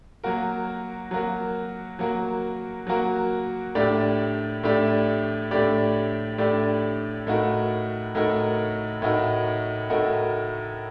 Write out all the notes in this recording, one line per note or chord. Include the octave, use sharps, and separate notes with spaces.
F#3 A#3 F#4 A#4
F#3 A#3 F#4 A#4
F#3 A#3 F#4 A#4
F#3 A#3 F#4 A#4
A2 A3 D4 G4 D5
A2 A3 D4 G4 D5
A2 A3 D4 G4 D5
A2 A3 D4 G4 D5
A2 A3 D#4 F#4 A#4
A2 A3 D#4 F#4 A#4
A2 A3 D#4 F#4 A#4
A2 A3 D#4 F#4 A#4